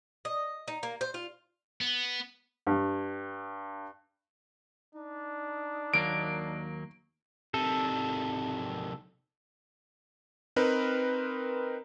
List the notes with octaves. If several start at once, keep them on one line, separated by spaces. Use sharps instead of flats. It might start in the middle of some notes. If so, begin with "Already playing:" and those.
D#5
D#4
A#3
C5
F4
B3
G2
D4 D#4
D#2 F#3 A#3 D7
C3 D#3 A4
C4 D#4 A#4 B4